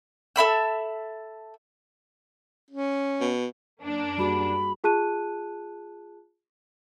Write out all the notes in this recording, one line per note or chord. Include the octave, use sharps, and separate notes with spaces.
A4 E5 B5 E6
C#4
B2
F#2 A#3 D4
G3 F#4 G#4 B5
F4 G#4 A5 F#6 D#7